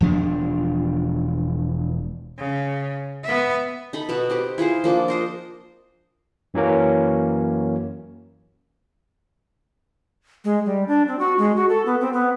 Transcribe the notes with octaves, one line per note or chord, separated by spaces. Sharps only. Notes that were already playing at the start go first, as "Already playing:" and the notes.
E1 F3 D4
C#3
B3 E5
D#4 A4 B5
B2 B3 A5
C4 G4 B4
E4 F4 G#4 C5
F3 A#3 D4 D6
A#4 C5 D#5
F#2 E3 F#3 A#3 C#4
G#3
G3
D4
C4
F#4
G#3
F#4
A4
B3
C4
B3